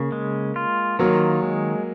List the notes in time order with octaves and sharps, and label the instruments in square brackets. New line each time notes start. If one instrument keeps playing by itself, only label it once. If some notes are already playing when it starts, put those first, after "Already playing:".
Already playing: [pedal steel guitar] C#3 [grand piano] A#3
[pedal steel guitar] G#3
F4
[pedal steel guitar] D#3 [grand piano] F#3 A#3
[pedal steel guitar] G#3